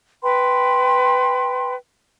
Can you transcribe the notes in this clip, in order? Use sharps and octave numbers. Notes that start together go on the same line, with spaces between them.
B4 G5 B5 C6